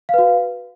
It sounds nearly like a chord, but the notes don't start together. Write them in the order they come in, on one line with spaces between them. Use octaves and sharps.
F5 B4 F#4